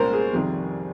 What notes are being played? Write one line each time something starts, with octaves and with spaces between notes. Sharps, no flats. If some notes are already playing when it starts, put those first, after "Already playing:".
Already playing: C2 A#2 G#3 C#4 A#4 C5
G#4
F2 C3 D#3 G3